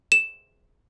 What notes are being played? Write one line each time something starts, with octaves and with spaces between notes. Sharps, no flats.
E7